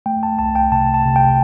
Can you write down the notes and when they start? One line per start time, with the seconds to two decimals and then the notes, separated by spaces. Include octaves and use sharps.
0.06 A3 G5
0.23 A5
0.39 C2 A5
0.55 G5
0.72 C3 A5
0.94 A5
1.05 C3
1.16 G5